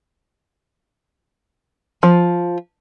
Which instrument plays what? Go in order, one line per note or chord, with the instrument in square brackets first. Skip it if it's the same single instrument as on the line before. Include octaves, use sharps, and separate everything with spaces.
[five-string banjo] F3